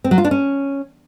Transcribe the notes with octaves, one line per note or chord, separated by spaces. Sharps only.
C4
F#3
F4
D4
C#4